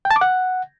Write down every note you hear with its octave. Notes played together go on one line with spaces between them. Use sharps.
G5
A5
D6
F#5